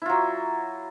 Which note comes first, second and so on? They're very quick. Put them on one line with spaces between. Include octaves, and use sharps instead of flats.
E4 F4 F#3